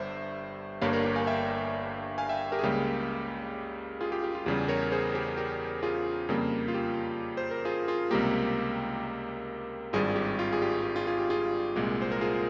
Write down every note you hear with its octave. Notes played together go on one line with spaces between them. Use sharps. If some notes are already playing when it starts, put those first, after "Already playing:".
Already playing: G1 G2 G3 C5 E5
G1 G2 G3 A#3 C#5 F5
A#4 C#5
G4 A#4
F5 G#5
E5 G5
F5 G#5
E5 G5
G4 A#4
G#4
C#2 C#3 G3 A#3 G4
F4 G#4
G4
G4
F4
E2 C#3 G3 G4
A#4 C#5
G#4 C5
G4 A#4
G4 A#4
F4 G#4
F2 C#3 G3 A#3
F4
G4
C5
A#4
F4 G#4
F4 G#4
C#2 C3 G3 A#3 G4 A#4
G#1 G2 G3 F4 G#4
G4
F4
G#4
G4
G4
F4 G#4
F4 G#4
G4
F4 G#4
C2 A#2 G#3
C5
A#4
F4 G#4